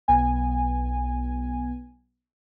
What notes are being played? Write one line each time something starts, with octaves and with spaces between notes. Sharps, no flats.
B1 B3 G#5